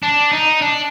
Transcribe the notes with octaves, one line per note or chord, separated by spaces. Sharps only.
D4
D#4
D4